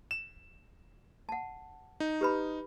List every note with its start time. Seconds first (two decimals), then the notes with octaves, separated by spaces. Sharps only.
0.11 E7
1.29 F#5 A5
2.00 D#4
2.21 G4 B4 B5